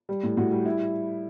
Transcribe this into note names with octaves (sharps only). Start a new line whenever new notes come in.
G3
A2
A2 F#4
G3
E4